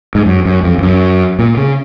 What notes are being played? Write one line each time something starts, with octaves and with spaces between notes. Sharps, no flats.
G#2
F#2
F#2
F2
F2
F#2
A#2
C#3